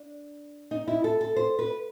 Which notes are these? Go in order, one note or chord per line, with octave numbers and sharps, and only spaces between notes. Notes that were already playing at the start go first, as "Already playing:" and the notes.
Already playing: D4
D#4
E4
A4
A4
C5
B4